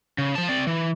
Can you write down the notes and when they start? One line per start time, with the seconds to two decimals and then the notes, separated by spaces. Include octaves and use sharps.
0.18 C#3
0.35 F3 A5
0.49 C4 D5
0.67 E3